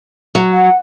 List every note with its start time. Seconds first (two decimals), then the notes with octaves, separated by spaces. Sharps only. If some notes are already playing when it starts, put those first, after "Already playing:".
0.35 F#3
0.53 F#5